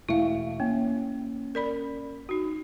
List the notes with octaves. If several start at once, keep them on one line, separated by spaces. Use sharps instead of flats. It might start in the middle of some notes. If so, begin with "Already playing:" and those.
E1 A3 E4 F5
A#3 C#4
A#4 D5 B5
D#4 F#4